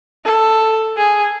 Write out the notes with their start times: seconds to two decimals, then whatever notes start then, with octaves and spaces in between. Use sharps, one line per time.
0.25 A4
0.97 G#4